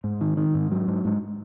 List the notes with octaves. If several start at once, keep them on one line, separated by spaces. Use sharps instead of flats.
G#2
D#3
D#3
G#2
F#3
G#2
G#2